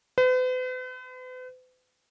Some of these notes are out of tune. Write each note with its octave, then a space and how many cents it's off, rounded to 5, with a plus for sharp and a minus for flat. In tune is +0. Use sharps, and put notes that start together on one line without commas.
B4 +45